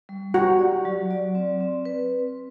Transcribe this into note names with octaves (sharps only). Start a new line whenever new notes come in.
G3
F#4 G4
D5
F#3
D5
C4
C4
B4